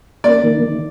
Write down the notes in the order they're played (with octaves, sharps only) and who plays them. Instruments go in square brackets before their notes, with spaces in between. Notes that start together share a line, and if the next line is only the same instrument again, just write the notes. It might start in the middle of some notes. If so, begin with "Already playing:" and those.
[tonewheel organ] A#3 [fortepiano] D5
[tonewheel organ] D#3
D#3